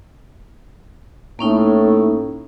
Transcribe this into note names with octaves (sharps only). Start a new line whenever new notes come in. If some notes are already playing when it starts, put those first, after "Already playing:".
A2 A#3 C#4 D#4